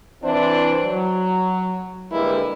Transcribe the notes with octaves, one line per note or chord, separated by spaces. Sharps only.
E3 C4 D4 E4 C5
F#3
D3 G3 G#3 A#3 E4 B4